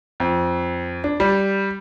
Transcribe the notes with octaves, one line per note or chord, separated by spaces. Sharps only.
F2
D4
G3